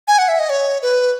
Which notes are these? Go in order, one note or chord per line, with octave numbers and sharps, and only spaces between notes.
G#5
F#5
E5
D#5
C#5
B4